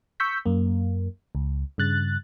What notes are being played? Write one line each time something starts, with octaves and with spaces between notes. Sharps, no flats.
C#6 E6 G6 B6
F#2 A#3
C#2
G2 C#3 F#6 A6